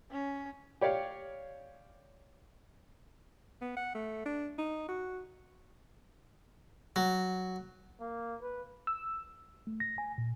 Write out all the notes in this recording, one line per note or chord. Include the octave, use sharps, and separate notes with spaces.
C#4
G4 C#5 D5 F5
B3
F#5
A3
D4
D#4
F#4
F#3
A#3
B4
E6
A3
A#6
G#5
A#2